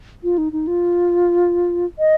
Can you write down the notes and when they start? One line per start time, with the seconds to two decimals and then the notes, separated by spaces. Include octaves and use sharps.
0.24 F4
0.38 D#4
0.52 D#4
0.67 F4
1.99 D#5